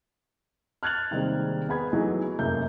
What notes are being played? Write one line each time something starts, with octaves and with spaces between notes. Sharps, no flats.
F6 F#6 G#6 A6 F7 F#7
C3 D#3 G3 G#3 A#3 C4
B3 G#4 F#5 B5 G#6
E3 F#3 A3 B3 D#4 G#4
F1 F#2 A#3 E5 G6